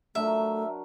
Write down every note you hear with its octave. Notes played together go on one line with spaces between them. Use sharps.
F#3 A3 D4 A#4 E5